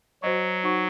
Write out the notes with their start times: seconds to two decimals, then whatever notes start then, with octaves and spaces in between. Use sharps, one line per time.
0.22 F#3 F#4 C5 D#5 F#5 C#6
0.64 D#4 F#4 C5 F#5 C#6